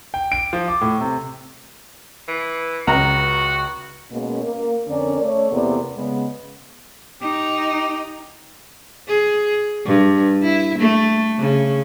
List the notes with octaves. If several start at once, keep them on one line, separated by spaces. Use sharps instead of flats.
G5
D7
F3
D6
A2
C3
E3
C#2 F#4 A#5
B2 G#3 A#3 C#4
A#3
F2 D3 C4 C#4 A#4 D5
A3 C#5 D5
E2 C3 A#3 B3 A4 D5
C#3 G#3 B3
D#4 G4
G#4
G2
E4
A3
C#3